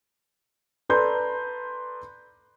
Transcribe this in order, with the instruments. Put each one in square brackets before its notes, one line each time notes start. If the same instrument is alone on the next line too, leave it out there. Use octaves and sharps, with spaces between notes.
[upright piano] A4 B4 D5 A#5 C6 G6